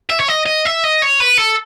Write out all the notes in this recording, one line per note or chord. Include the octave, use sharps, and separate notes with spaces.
E5
C#5
D#5
D#5
E5
D#5
C#5
B4
A4